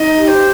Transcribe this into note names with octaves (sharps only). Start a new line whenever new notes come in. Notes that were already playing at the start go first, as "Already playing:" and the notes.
Already playing: D#4 D#5
G4
C5